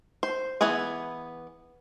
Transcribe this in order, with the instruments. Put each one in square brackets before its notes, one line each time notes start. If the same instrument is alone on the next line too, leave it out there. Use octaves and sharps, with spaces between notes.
[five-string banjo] C5
E3 B3 G#4 G#5